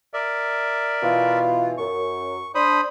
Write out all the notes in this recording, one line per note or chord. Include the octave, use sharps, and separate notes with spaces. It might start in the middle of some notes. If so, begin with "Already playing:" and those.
A#4 D5 E5
B2 E3 F4
F#2 C#6
D4 C5 B5 D#6